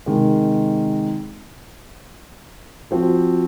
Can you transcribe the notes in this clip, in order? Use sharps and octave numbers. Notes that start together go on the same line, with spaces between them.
C3 D#3 G#3
F3 C4 F#4 C5